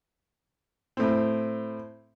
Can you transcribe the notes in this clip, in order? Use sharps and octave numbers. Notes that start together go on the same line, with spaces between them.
A2 C4